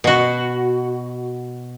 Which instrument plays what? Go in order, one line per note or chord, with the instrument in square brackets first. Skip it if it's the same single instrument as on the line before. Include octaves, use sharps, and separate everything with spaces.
[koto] B2 F#4